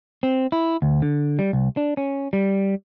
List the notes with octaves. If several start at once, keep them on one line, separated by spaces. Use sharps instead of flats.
C4
E4
D2
D3
G3
C2
D4
C#4
G3